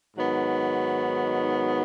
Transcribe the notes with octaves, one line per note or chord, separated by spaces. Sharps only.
G#2 D#3 F#3 B3